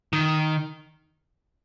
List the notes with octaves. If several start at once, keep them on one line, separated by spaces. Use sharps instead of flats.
D#3